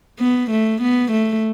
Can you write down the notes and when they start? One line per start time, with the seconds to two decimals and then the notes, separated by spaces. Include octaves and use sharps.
0.20 B3
0.51 A3
0.81 B3
1.12 A3